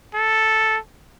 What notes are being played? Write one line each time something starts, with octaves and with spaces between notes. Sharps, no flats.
A4